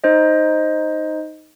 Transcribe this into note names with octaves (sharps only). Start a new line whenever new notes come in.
D#4 C5 D#5